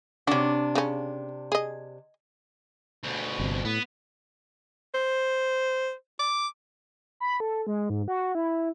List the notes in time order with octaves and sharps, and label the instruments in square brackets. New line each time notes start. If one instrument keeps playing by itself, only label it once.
[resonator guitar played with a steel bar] C3 D4 [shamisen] C#4 F#4
[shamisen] C#3 C#4
G#4 D#5
[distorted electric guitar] D2 B2
[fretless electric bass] G1 C3
[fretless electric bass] A2 [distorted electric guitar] B3
[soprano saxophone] C5
D6
[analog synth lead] B5
A4
G#3
G#2
F#4
E4